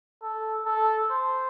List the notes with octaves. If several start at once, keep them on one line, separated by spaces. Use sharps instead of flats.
A4
A4
C5